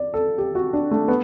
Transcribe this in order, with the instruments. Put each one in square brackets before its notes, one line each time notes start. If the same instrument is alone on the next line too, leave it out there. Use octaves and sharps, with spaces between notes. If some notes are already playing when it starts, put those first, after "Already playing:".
Already playing: [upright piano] D5
A4
G4
F#4
D4
A3
B3